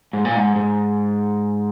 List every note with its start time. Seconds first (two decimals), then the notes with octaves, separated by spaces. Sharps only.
0.13 G#2
0.25 A#2
0.36 G#2
0.56 G#2